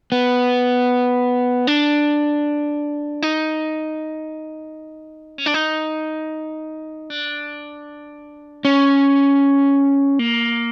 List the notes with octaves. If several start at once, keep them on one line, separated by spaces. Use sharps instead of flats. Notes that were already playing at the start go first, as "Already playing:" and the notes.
B3
D4
D#4
C#4
D4
D#4
D4
C#4
A#3